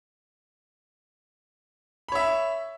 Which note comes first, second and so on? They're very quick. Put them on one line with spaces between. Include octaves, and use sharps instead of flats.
B5 C#5 E5